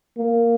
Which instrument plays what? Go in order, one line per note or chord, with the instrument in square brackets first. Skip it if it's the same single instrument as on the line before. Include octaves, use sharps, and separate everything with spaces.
[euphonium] A#3